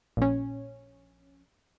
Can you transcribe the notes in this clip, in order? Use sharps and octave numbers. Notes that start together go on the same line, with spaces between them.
A#1 C#4